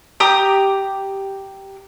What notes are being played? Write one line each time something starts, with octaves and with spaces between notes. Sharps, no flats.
G4 A#5 D#6